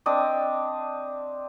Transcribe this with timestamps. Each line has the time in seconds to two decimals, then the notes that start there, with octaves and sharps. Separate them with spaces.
0.06 C4 D4 D#5